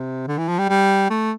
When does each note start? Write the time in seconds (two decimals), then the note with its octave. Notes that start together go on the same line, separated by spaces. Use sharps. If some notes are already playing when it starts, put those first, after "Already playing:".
Already playing: C3
0.27 D3
0.38 E3
0.49 F3
0.59 G3
0.69 G3
1.10 A3